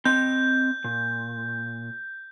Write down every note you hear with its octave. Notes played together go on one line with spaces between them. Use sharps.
C4 D#5 G6
A#2